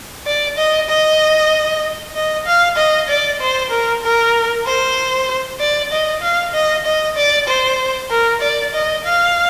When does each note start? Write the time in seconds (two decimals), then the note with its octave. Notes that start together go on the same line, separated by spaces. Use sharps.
0.26 D5
0.57 D#5
0.90 D#5
2.15 D#5
2.46 F5
2.77 D#5
3.09 D5
3.41 C5
3.71 A#4
4.03 A#4
4.66 C5
5.60 D5
5.92 D#5
6.22 F5
6.54 D#5
6.86 D#5
7.16 D5
7.48 C5
8.11 A#4
8.41 D5
8.74 D#5
9.04 F5